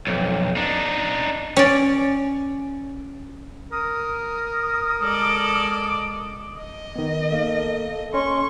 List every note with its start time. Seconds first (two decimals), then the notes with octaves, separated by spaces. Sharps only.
0.07 B1 F2
0.56 D4 D#4
1.56 C#4 D5
3.72 A#4 D#6
5.02 G#3 A4 D5 D6
6.58 D#5
6.96 D#3 B3
7.32 A#3 A4
8.14 C#4 C6 C#6